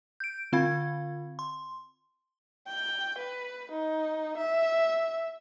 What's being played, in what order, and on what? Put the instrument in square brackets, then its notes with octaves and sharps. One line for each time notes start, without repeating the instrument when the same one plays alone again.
[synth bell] G6 D7
D3 C4 F4 F5 B5 G#6
C6
[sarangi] G5
B4
D#4
E5